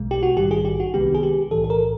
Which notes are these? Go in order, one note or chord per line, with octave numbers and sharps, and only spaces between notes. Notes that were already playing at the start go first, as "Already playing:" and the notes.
Already playing: B1 B2 G#3
G4
F#4
A#1 G#2 D#3 G3 G4
G#4
G4
F#4
C2 C3 D#3 G#3 B3 G4
G#4
G4
B1 A2 E3 A4
A4
A#4